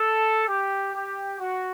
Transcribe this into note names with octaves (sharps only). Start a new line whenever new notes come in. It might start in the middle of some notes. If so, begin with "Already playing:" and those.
Already playing: A4
G4
G4
F#4